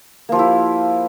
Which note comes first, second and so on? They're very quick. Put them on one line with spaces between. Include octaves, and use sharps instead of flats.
A#3 F3 G4 E4